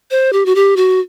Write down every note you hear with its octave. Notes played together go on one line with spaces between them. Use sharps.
C5
G4
F#4
G4
F#4